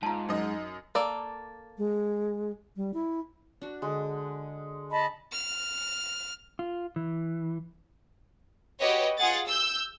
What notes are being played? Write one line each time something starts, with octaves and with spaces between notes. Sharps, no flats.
G#2 F4 A5 A#5
F#2 D#4 D#5
A#3 A4 D5
G#3
G3
E4
D4 F#4
D3 G#3
D#5 A5 B5
F6
F4
E3
F#4 G4 B4 C#5 D#5
F4 G#4 F#5 A6
E6 G6